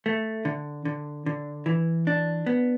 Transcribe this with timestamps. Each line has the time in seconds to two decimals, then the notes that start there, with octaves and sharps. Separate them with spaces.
0.06 A3
0.45 D3
0.85 D3
1.26 D3
1.66 E3
2.07 D4
2.46 B3